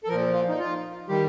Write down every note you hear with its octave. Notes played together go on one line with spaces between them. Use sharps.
A4
A#2 F3 A#4
F4
D#4
F4
D#3 G3 G4